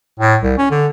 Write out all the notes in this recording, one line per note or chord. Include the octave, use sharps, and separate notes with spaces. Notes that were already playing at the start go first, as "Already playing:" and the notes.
A2
C2
C#4
D3